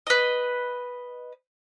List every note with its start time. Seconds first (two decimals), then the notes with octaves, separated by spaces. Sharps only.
0.07 B4 D#5